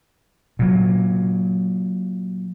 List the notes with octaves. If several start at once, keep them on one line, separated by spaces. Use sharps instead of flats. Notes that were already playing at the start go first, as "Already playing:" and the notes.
A#2 F#3